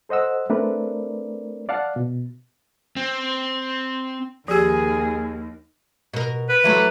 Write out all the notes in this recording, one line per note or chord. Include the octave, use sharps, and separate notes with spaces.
A4 C5 D#5 F#5 E6
A3 C4 D4 A#4 B4 D5
D5 F5 F#5 A5
B2
C4
D#2 D#3 F3 G4 G#4
B2 A#4
B4
E3 F#3 A3